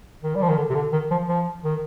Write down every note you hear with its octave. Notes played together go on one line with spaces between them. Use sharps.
D#3
G3
F3
D#3
D3
C3
D3
D#3
F3
F3
D#3